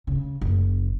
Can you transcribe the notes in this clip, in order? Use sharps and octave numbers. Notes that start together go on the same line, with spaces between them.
C#3
F#1